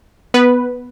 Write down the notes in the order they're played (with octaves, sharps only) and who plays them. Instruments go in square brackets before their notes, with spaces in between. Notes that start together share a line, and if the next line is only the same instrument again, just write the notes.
[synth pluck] B3 B4